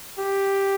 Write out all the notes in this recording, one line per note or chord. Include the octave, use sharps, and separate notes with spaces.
G4